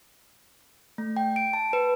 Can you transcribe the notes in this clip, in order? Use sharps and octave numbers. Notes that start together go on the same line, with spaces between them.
A3
G5
D7
A5
B4